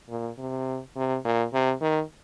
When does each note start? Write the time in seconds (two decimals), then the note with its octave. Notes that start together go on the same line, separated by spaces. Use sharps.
0.09 A#2
0.38 C3
0.96 C3
1.25 A#2
1.53 C3
1.81 D#3